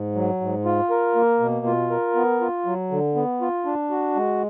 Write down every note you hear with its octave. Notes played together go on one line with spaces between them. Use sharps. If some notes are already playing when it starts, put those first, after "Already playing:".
Already playing: G#2
F#3
G#2
F4
A#4
A#3
B2
F4
A#4
B3
F4
F#3
D3
B3
F4
D4
F#4
G#3